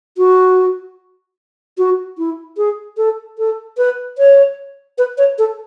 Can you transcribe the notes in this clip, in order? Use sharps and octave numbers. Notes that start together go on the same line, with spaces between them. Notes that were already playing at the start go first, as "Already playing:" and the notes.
F#4
F#4
E4
G#4
A4
A4
B4
C#5
B4
C#5
A4